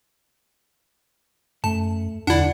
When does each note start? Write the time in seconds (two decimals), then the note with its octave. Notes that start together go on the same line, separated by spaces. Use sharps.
1.64 F#2 A3 A5
2.27 B1 E2 D3 D4 E4 D5 F#5